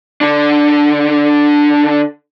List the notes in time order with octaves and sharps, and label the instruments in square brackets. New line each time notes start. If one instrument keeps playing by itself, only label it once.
[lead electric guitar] D3 D4